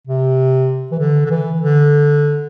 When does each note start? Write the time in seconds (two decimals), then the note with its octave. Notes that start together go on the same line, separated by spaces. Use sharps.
0.07 C3
0.91 E3
0.99 D3
1.25 D3
1.30 E3
1.61 D3